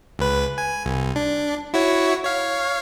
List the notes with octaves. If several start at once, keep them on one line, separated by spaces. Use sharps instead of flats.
C#2 B4
G#5
C2
D4
E4 F#4 C#5
C#5 F5